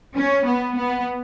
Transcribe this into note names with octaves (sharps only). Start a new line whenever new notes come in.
C#4
B3
B3